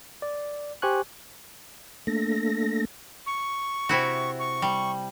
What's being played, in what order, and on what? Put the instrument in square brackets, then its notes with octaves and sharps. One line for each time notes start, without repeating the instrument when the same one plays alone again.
[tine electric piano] D5
G4 C5 G#5 C#6 F#6
[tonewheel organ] A3 A#3 D4 A4 A#6
[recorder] C#6
[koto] C3 E4 F#4
[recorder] C#6
[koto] G3